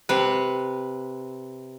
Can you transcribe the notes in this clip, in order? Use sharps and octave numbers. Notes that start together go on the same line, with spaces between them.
C3 B4